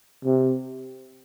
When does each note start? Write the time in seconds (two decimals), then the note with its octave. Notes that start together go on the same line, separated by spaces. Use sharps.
0.25 C3